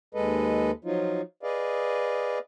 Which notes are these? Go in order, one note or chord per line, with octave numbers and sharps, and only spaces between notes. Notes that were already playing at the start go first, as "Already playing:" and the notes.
D#2 G#3 A4 B4 D#5
F3 F#3 D#4 F4
G#4 B4 D5 D#5 F5